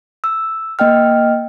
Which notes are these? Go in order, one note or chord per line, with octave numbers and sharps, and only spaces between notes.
E6
A#3 D#5 G5 F6